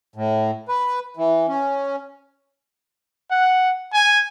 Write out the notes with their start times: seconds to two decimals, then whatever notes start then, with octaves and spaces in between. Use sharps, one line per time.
0.16 A2
0.68 B4
1.17 E3
1.48 C#4
3.30 F#5
3.94 G#5